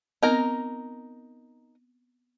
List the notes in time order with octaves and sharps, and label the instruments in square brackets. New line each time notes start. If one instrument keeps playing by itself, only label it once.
[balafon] B3 C4 [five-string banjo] D#4 A#4